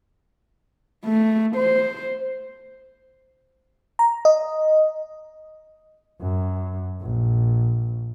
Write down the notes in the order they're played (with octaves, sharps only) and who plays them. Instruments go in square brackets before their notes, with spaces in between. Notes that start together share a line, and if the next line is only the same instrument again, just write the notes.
[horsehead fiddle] A3
C5
[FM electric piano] A#5
D#5
[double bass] F#2
A#1